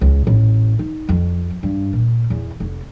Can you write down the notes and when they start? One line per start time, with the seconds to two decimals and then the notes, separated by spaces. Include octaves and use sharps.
0.01 C#2
0.27 A1
0.79 D#4
1.09 F2
1.63 G2
1.93 A#2
2.30 E2
2.60 F1